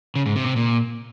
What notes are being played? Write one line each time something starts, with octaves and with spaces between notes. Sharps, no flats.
C#3
G#2
C3
C3
A#2